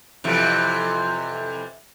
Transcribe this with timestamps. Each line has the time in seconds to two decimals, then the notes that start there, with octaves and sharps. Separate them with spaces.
0.24 F2 C3 E3